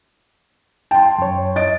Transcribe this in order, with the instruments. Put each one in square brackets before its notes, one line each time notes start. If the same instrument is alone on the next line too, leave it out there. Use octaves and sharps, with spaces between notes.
[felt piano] G5 C6 [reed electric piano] A5
[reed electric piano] F#2 C#5
[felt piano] D#5 A6 D7